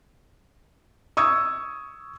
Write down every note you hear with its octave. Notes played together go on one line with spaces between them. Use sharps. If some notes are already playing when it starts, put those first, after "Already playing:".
C#6 D#6 E6 G#6